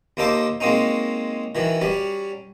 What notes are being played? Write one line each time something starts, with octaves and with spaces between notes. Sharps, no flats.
D#2 A#3 D#4 A4 C5 D6
F#3 G#3 A#3 C4 C#4 D#4
D#3 E3 F#3
F#3 G3 C#4